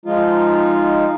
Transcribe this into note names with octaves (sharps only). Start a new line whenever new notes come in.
F3 G#3 D#4 F4